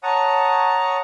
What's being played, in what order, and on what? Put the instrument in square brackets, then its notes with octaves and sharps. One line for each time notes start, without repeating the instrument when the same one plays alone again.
[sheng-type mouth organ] C#5 F#5 A5 A#5 C#6 D#6